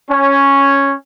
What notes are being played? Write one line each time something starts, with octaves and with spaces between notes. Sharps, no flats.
C#4